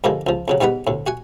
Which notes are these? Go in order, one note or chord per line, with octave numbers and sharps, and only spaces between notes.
G2 D3 F3 G#3 A#3
C#2 F3
F2 C#3 F#3
G#2 G3 B3 D#4 F#5 B5
D2 A2
F#4 F#5 G#5